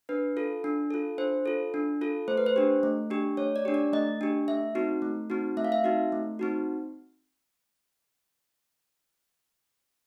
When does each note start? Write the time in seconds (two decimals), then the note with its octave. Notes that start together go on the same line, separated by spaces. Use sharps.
0.09 D4 B4
0.37 F4 A4
0.64 D4
0.91 F4 A4
1.18 D4 C5
1.46 F4 A4
1.74 D4
2.01 F4 A4
2.28 A3 C5
2.37 B4
2.46 C5
2.56 D4 G4
2.83 A3
3.11 D4 G4
3.37 A3 C#5
3.56 D5
3.65 D4 G4
3.74 D5
3.93 A3 D#5
4.21 D4 G4
4.48 A3 E5
4.75 C4 D#4 F#4
5.02 A3
5.30 C4 D#4 F#4
5.57 A3 E5
5.65 F5
5.72 E5
5.84 C4 D#4 F#4
6.12 A3
6.39 C4 D#4 F#4